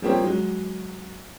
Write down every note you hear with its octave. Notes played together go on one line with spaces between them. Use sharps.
F3 G3 A#3 C4 G4 C#5
F#3 G#3